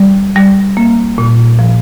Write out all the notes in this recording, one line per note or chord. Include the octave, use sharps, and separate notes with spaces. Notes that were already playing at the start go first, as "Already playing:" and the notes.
Already playing: G3
G3
A#3
A#2
F3